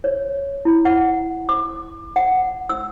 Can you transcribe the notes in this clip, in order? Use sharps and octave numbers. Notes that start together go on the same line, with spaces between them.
C#5
E4
F#5
D6
F#5
E6